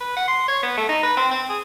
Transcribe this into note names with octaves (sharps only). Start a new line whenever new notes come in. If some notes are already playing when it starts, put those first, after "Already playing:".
B4
F#5
C6
C#5
B3
A3
D#4
B4
C4
C4
G#4